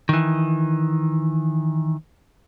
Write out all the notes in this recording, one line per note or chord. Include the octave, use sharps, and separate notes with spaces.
D#3 E3